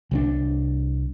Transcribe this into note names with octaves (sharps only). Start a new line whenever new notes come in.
C2 G3 D4